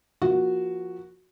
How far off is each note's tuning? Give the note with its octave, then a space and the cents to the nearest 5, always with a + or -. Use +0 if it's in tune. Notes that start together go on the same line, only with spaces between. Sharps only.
F3 +0 A#3 +25 F#4 +0